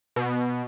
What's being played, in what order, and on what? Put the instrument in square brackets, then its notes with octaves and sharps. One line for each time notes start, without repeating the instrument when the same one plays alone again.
[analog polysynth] B2